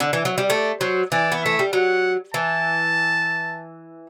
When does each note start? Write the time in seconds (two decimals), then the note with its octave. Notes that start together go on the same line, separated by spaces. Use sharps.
0.00 D3
0.13 E3
0.25 F#3
0.38 G3
0.50 A3 D5
0.80 F#3 C5
1.12 E3 D5
1.32 B3
1.43 A3 E5
1.59 G3
1.73 F#3 F#5
2.34 E3 A5